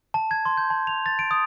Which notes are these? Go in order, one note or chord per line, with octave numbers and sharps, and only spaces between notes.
A5
G#6
C6
G6
A5
F7
A6
D7
D#6